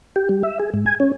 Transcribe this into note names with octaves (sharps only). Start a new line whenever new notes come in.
G4
G3
E5
G#4
G#2
G#5
C#4